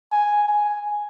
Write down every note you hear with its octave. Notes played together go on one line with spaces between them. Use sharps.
G#5
G#5